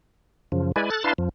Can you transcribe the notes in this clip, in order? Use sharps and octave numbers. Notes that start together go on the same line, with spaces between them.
F#2 C#3 F3
G#3 E4 B4 D5 G#5
A4 F#6 A6
D4 E4 B4 F5 A5 C6
F2 F3